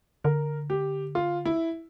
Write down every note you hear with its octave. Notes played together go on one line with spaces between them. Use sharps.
D3 A#4
G4
F4
E4